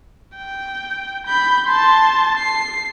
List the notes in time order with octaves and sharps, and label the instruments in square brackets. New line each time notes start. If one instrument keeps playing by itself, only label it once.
[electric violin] G5
B5 G6
A5 C6
C7